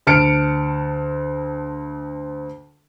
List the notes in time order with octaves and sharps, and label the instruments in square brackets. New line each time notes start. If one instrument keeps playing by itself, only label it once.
[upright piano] D2 A5 F6 C#7 D7